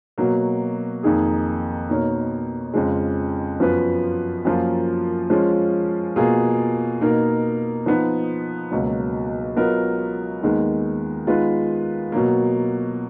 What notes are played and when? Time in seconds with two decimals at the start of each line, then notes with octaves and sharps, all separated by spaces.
0.18 B2 F#3 A#3
1.03 F2 D#3 A#3 D#4 G#4
1.89 B2 A#3 D#4 A#4 C#5
2.74 F2 C#3 F3 G#3
3.60 F#2 F3 B3 F4 B4
4.45 F#2 F3 A#3 F4
5.30 F3 G#3 C#4 F4
6.16 B2 A#3 F4 G#4
7.01 B2 A#3 D#4 A#4
7.86 F3 B3 D#4
8.71 C#2 B2 F#3 A#3
9.56 F#3 B3 F4 A#4 D#5
10.42 D#2 D#3 G#3 B3
11.27 D#3 G#3 B3 F4 B4
12.12 B2 F#3 A#3